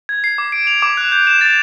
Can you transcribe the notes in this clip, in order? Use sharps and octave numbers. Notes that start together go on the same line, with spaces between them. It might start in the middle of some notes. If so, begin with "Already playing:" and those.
G#6
C7
D6
D7
F7
D6
F#6
G6
E7
A6